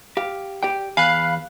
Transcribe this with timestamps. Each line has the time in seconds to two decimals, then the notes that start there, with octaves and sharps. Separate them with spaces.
0.17 G4 F5
0.63 G4 D5 G5
0.97 E2 F5 G#5 B5 F#6